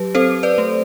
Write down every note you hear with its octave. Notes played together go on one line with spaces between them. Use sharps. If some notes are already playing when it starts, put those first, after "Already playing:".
Already playing: F#3 G4 B4
C4 A4 C5
B4 D5
A3